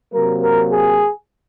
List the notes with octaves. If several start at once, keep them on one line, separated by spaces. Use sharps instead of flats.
C3 F#3 A#3 A#4
A#4
G#4